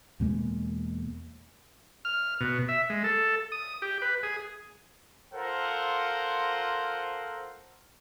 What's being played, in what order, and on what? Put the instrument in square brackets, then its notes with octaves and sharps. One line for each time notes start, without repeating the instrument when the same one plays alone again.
[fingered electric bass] E2 B2 G#3 A#3
[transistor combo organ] F6
B2
E5
G#3
A4
D#6
G4
B4
G#4
[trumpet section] F4 A4 A#4 C5 F#5